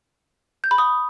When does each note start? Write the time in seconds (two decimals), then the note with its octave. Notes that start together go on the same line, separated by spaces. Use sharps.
0.64 G6
0.71 B5
0.78 D#6